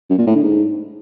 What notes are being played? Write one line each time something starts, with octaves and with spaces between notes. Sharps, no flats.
F#2
A#2
A2
D3
G#2